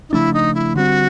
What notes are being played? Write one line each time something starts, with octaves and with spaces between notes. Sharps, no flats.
D#4
C#3 F3 A3 D4 E4
D#4
E4
D3 G3 C4 F#4